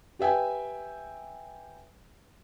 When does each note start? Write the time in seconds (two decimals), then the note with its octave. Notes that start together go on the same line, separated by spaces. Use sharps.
0.19 G4 B4 E5 G5 G#5